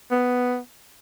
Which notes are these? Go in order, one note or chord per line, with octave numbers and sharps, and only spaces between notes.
B3